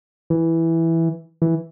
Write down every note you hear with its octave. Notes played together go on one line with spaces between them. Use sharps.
E3
E3